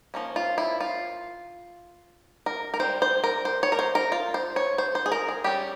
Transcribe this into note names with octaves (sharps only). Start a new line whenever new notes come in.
F3 A#3 C#4
F4
E4
F4
A#4
A#4
G3 C4 C5
C5
A#4
C5
C#5
A#4
C5
A#4
F4
C5
C#5
C5
C5
G#4
A#4
G#4
G3 C#4 G4